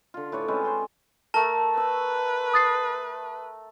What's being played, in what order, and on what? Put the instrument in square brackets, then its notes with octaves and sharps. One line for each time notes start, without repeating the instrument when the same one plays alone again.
[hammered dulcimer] D3 F4
A2 B4 C#5 D5
G#3 C4 C#4 B4
C5 D5 C6
[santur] A3 A4 A#4 [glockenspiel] A5
[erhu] B4 [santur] E6
[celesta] D#6 A6 C7